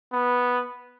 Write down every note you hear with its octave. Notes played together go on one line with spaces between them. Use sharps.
B3